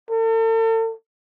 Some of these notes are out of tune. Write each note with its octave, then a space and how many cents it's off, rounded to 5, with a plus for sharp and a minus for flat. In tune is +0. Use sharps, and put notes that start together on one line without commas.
A4 +40